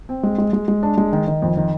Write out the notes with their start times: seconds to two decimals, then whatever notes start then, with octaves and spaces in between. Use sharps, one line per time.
0.09 C4
0.23 G#3
0.38 G#3
0.53 G#3
0.68 G#3
0.83 D4
0.98 G#3
1.13 D#3
1.27 D#3
1.42 F2
1.57 D#3